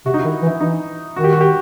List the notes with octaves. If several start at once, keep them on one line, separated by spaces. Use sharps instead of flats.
C3 F#4
D#4
E4
D#3
E3
E4
E3 D#4
D#3 F#4
G4
F#4
G4